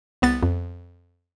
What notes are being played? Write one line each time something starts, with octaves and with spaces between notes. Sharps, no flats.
C2 B3 A6
F2